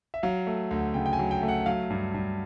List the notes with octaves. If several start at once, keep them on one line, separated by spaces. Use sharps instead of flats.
E5
F#3 F5
A3
D2
C#3 G5
G5
G#5
F#3
G5
A3
F#5
F#3 F5
G2
G2